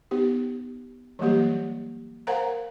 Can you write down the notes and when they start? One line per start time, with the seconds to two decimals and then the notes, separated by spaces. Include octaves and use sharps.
0.11 B3 D#4 G4
1.19 E3 F#3 G3 A#3 G4
2.27 A#4 C5 F5 F#5 G#5 A#5